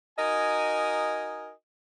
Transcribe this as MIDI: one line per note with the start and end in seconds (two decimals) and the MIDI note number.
0.18 1.52 63
0.18 1.52 66
0.18 1.52 70
0.18 1.52 75
0.18 1.52 80